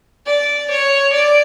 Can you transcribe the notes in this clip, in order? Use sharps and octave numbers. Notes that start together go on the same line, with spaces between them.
D5
C#5
D5